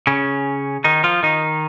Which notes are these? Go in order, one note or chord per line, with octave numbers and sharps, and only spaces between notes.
C#3 C#4
D#3 D#4
F3 F4
D#3 D#4